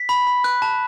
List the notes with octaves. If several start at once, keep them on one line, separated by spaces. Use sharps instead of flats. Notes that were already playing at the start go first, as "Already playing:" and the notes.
Already playing: B6
B5
B5
F#6
A5